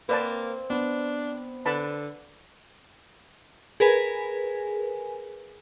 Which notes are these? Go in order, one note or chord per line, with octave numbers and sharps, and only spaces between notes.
A#3 C4 B4 C5 D5 A5
B3 D4
D3 B4 A5 B5
G#4 A#4 B4 G#5